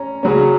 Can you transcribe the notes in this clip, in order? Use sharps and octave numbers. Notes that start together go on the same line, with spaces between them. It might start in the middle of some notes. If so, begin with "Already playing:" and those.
Already playing: C#4 A#5
C#3 F#3 C#4